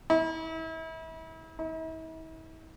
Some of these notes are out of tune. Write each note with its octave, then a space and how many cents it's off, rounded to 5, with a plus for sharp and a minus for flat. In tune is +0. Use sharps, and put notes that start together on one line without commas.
E4 -35
E4 -45